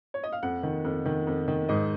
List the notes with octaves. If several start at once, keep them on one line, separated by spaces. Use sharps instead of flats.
C#5
D#5
F5
F2 F#5
D#3
F2
D#3
F2
D#3
G#2 D#5